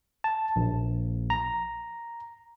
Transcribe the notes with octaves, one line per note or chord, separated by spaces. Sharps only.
A5
A#1
A#5